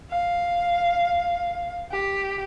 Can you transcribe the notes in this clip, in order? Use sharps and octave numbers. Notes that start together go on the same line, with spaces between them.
F5
G4